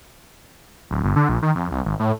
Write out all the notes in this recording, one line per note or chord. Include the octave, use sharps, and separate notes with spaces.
D1
G1
D3
A#1
D#3
F2
C2
G#1
A2